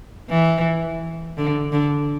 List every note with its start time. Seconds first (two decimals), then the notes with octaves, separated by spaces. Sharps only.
0.30 E3
1.38 D3
1.72 D3